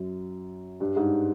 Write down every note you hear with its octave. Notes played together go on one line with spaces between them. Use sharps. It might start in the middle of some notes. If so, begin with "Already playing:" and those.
Already playing: F#2
G2
G#2